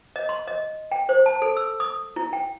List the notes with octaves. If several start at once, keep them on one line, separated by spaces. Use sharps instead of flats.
D#5
C6
D#5
G5
C5
A5
A4
E6
D#6
E4
G5